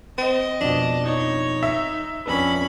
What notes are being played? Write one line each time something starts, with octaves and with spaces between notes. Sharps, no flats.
C4 D#5
F2 B2 D4
D#4 C#5
E5
F2 C#4 D4 B4 B5